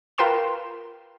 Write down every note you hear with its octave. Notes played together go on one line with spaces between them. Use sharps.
F4 A#4 B4 G5 C6 E7